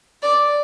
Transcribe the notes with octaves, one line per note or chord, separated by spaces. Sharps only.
D5